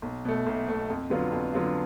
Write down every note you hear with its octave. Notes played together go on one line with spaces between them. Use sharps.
B1
B2 A3
B1
B2 A3
F2
D3 F#3 B3 F4
F2
D3 F#3 B3 F4